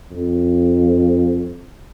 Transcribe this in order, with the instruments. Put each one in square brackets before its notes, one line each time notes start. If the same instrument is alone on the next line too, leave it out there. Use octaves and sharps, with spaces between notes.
[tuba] F2